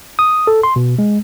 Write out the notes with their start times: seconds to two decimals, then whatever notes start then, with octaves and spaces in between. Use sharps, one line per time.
0.19 D#6
0.47 A4
0.63 C6
0.76 B2
0.99 G#3